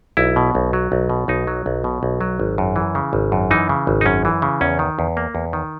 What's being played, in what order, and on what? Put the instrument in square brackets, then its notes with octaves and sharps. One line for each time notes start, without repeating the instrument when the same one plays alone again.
[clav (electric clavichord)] B1 E4
B2
B1
F#3
B1
B2
B1 D#4
F#3
B1
B2
B1
F#3
G#1
F#2
E3
C#3
G#1
F#2
E3 D#4
C#3
G#1
D#4
F#2 C#4
E3
C#3
E2 C#4
D#3
E2
A#3
E2
D#3